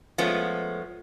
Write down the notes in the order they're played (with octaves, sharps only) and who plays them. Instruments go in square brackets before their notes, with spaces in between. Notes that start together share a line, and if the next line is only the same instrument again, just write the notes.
[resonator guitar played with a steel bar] F3 G#3 A3 B3 C#4